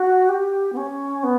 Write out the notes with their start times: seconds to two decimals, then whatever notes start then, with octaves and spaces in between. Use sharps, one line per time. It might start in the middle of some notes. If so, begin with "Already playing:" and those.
Already playing: F#4
0.29 G4
0.73 B3
0.77 C#4
1.23 B3